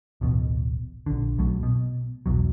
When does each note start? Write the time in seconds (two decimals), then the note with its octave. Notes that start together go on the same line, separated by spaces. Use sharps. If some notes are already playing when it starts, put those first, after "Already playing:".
0.21 D1 A1 B2
1.06 A#1 D3
1.38 B1 F#3 A3
1.63 B2
2.26 B1 E2 B2 F#3